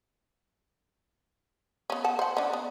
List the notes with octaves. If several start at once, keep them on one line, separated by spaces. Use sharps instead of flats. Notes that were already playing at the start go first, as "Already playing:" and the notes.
B3 C#4
F#5 A5
C5 F#5
C#4 D4
B3